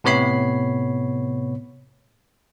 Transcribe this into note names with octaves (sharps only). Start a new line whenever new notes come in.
A2 C3 B3 C#5 B5 C7